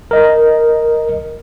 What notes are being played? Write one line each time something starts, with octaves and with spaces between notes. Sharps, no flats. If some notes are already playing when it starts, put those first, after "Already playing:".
A#4 D#5